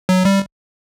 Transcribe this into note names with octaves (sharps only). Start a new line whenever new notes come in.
F#3
G3